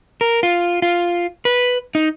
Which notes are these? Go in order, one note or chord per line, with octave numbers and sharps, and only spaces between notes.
A#4
F4
F4
B4
D#4